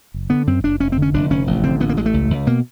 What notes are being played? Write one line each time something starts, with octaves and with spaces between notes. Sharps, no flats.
F#1
D3 B3
F#2 C4
F#1 D4
F1 C#4
C4
D3
C#4
F1 D4
F1 C#4
A1
D3 C4
A1 B3
A#3
A1 G#3
A3
C#2
C#2
B2 A#3